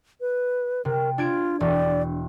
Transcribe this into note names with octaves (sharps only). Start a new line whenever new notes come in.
B4
C3 A#4
D4 F4 G#6 D7
E1 D5